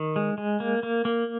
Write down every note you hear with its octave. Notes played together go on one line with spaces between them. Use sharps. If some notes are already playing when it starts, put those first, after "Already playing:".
Already playing: D#3
G#3
G#3
A#3
A#3
A#3